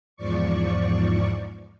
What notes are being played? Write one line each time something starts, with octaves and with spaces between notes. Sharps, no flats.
E2 G#2 F3 D5 C#6